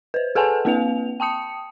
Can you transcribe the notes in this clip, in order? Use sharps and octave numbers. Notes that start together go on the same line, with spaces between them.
B4 C5
G#4 A4 B4 F#5 G#5 A5
A#3 C4 B4 F5 F7
G5 A5 D#6 C#7